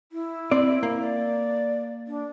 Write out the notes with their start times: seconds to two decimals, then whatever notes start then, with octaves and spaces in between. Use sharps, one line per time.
0.12 E4
0.51 C4 D5
0.83 A#3
1.01 D5
2.08 D4